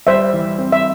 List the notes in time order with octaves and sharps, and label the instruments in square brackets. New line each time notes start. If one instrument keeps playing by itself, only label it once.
[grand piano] G3 [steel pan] C5 E5
[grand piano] E3
C4
[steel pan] E5